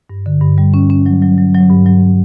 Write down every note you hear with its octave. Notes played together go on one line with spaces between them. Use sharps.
G2
D3
G2
G3
C#4
C#4
F#3
F#3
F#3
F#3
G2
F#3